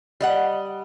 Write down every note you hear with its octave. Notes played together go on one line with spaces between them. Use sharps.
G3 D#5 F#5